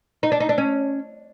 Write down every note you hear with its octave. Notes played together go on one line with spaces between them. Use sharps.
D#4
D4
D#4
D4
C#4